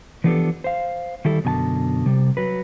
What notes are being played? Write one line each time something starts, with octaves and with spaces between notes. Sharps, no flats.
E3 F3 B3 D4 G4 A4
C5 F5
D#3 G3 E4 A4
F#2 B2 D3 G#5 A5
C3 G3
F#3 B4